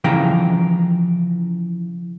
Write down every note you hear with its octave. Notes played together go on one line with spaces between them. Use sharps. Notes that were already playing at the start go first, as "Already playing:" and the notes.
C#3 E3 F3 F5 G5 A#5